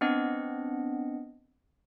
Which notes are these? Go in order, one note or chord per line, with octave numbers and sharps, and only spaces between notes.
B3 C4 D4 D#5 F#5